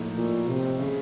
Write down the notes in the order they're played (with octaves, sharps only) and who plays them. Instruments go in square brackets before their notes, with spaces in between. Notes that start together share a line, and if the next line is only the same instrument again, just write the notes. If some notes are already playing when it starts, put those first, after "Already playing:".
Already playing: [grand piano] A2 F3 A#3 D#4
[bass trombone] A#2
C3
[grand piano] C#3